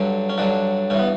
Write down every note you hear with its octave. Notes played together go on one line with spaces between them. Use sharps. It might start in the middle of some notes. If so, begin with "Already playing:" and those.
Already playing: G2 D3 F#3
C#4
G2 D3 F#3 D4
G2 E3 C#4
B3